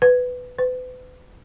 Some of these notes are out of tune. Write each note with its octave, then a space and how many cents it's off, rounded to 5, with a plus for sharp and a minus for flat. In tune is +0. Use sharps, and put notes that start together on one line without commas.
B4 +10
B4 +40